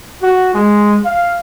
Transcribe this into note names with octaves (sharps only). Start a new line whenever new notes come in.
F#4
G#3
F5